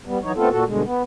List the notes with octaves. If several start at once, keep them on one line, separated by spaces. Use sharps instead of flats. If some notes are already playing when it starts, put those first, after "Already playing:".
G3 B3
E3 F#3 D#4 C#5
A3 B3 C4 F4 A4
A#2 F#4 A4
G2 B2 D3 G#3
B3